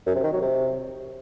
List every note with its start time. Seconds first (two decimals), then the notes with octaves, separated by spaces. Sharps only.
0.06 F#2
0.15 C3
0.24 D#3
0.33 F#3
0.42 C3